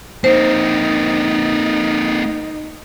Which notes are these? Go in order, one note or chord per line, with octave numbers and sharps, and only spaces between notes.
A#3 C4 D#4 C5